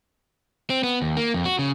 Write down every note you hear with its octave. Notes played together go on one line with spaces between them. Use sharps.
C4
B3
D#2
A#3
F2
F#4
C#3